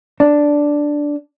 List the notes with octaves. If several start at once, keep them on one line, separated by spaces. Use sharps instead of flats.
D4